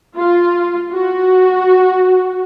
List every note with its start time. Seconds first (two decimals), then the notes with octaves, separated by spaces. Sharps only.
0.17 F4
0.92 F#4